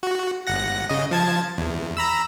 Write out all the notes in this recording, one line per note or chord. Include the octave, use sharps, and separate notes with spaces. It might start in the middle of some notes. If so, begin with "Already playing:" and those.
F#4
G1 F#5 A#6
C#3 D#5
F3 A5 G#6
E2
A#5 B5 E6